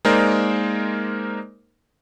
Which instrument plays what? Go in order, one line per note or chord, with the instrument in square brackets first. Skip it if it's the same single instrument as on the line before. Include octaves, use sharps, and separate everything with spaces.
[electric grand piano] G#3 A#3 D#4 A#4 C5 D5